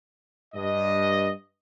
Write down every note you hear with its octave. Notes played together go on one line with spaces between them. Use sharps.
G2 D#5